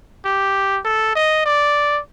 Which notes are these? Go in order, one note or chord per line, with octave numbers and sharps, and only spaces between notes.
G4
A4
D#5
D5